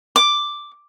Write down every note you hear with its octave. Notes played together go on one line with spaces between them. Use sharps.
D6